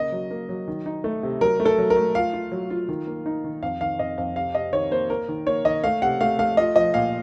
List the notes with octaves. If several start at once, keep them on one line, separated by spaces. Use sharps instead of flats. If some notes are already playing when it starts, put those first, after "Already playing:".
Already playing: C#3 A#3 D#5
F#3
A#3
F#3
D#3
D#4
A3
C3
F#3 A#4
A3
A4
F#3
A#4
A3
F4 F5
F4
F#3
F4
D#3
A#3
D#4
D#3
F2 F5
D#3 F5
F2 D#5
F2 F5
C3 F5
C3 D#5
D#3 C#5
A#3 C5
A#3 A#4
D#3
A#3 C#5
D#3 D#5
A3 F5
C3 F#5
A3 F5
A3 F5
F4 D#5
F3 D#5
A#2 F5